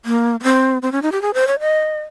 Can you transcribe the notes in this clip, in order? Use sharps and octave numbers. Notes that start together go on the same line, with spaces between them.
A#3
A#3
C4
C4
C#4
D#4
G4
G#4
C5
C#5
D#5